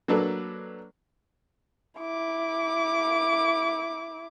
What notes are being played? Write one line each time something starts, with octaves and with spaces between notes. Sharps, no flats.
F#3 A#3 D4 A4 B4
E4 D6